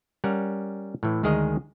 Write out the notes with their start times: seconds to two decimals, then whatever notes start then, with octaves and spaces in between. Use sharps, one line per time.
0.24 G3 C#4 A#4 F#5
1.03 A2 E3
1.23 D2 D#3 G#3 G#4 A#4 D#5